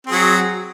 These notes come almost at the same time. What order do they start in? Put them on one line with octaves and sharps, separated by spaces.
C4 G#4 F#3